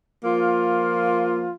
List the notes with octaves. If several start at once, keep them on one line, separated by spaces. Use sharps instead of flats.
F3 A#3 F4